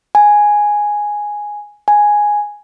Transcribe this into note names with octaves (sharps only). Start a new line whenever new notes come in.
G#5
G#5